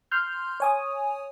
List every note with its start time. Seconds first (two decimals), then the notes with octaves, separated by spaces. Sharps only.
0.11 C6 F6 G6
0.60 C#5 G#5 D#6